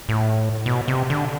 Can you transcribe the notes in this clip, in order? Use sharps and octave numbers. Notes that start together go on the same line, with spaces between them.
A2
B2
C3
D3